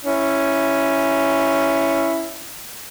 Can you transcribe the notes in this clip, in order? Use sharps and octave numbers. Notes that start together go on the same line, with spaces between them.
C#4 E4